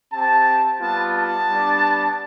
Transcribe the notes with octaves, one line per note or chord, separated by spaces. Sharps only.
C4 G4 A5
G3 B3 F4 A5
A5
G3 B3 D4